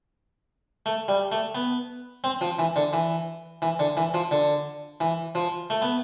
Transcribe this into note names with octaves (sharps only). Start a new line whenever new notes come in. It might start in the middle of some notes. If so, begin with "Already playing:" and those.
A3
G3
A3
B3
C4
F3
E3
D3
E3
E3
D3
E3
F3
D3
E3
F3
A3
B3